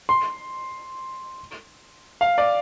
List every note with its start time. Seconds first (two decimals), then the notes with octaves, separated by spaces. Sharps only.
0.09 C6
2.21 F5
2.38 D5